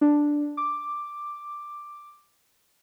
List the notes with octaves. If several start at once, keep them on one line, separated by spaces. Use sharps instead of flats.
D4
D6